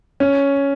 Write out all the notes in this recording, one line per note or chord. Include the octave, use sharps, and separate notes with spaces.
C#4